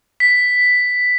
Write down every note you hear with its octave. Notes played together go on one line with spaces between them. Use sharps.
B6